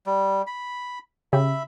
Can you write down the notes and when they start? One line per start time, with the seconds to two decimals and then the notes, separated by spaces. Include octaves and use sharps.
0.06 G3
0.47 B5
1.33 C#3 G4 E5 B5